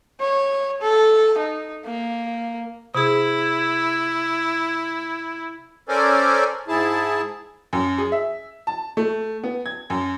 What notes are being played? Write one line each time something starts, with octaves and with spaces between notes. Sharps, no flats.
C#5
A4
D#4
A#3
C3 E4 G#4
C#4 A4 A#4 C5 D5 G#5
G#2 E4 G#4 A5
F#2
G#4
E5
A5
A3
B3
G#6
F#2